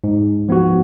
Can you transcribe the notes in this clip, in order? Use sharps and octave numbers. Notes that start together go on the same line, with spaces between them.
G#2
F3 B3 F#4